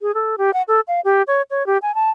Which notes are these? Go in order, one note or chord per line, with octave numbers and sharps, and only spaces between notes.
G#4
A4
G4
F#5
A4
F5
G4
C#5
C#5
G4
G#5
A5